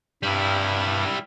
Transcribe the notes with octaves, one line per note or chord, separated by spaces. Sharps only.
G2 G3 E4